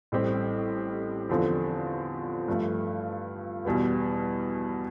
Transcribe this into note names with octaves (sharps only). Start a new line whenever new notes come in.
A1 A2 G3 C4 G4
E2 D3 F3 C4
G2 F3 A3
E2 B2 G3 B3